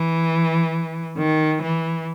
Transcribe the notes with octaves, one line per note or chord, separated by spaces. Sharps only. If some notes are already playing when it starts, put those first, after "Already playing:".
Already playing: E3
D#3
E3